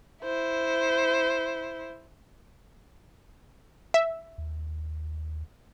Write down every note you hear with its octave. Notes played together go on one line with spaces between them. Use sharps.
E4 C5
E5
D#2